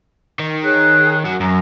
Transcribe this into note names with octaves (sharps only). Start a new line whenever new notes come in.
D#3
G#4 C#5 F#6
F#2 F#3
F#2 A#5